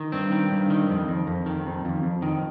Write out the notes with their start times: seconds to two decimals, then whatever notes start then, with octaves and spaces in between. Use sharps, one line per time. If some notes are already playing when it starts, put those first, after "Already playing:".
Already playing: D#3
0.12 G2 C4
0.32 D#3
0.51 G2
0.70 D#3
0.89 F2
1.08 F2
1.27 F2
1.46 D#3
1.66 F2
1.85 F2
2.03 F2
2.22 D#3